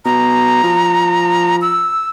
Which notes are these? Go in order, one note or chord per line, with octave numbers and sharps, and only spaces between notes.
B2 A#5
F3
E6